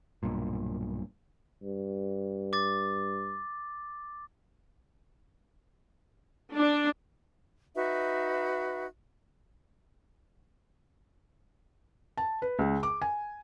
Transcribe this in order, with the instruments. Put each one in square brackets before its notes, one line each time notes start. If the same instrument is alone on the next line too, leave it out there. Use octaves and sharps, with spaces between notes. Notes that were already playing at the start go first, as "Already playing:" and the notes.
[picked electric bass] B1 G2 A#2
[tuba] G2
[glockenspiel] D6 A6
[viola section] D4
[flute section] D#4 F#4 B4 E5
[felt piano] A5
B4
C#2
D6
G#5